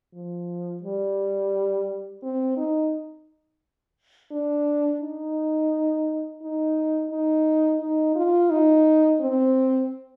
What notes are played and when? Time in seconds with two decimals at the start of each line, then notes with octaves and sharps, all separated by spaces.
0.13 F3
0.83 G3
2.23 C4
2.57 D#4
4.32 D4
5.01 D#4
6.42 D#4
7.11 D#4
7.80 D#4
8.16 F4
8.50 D#4
9.20 C4